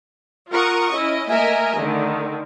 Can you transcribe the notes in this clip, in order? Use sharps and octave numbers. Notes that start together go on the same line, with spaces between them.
F4 A#4 F#5 C#6 D#6
C#4 E4 D#5
A3 A#3 A#4 D#5 E5 G#5
D3 D#3 A3